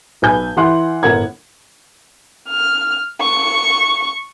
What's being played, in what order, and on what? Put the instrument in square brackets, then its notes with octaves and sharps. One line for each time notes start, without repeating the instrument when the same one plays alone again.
[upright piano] B1 B4 G#5 G6
E3 E4 F#5 C6 F#6
G1 A2 A#4 F#5 G#6
[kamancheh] F6
C#6